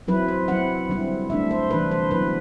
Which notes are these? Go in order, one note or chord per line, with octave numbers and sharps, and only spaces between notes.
F#3 C4 E4 B4
C5
F#3 C4 E4 F#5
D3 G3 C4 E4
D3 A3 D4 E5
C5
C3 E3 G3 D4 B4
C5
D3 F#3 B3 E4 B4